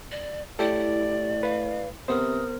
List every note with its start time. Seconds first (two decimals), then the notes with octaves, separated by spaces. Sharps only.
0.11 D5
0.59 A2 E4 G4 A4 D5
1.43 B4 F5
2.08 C3 B3 A#4 C5 D#6